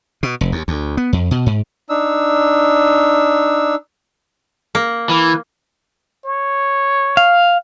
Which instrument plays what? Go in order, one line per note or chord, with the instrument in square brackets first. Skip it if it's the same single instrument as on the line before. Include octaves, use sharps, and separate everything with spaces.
[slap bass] B2
F1
D#2
D2
B3
F2
B2
G#2
[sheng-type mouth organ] D4 D#4 E6
[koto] A#3
[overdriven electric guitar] E3
[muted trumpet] C#5
[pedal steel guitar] F5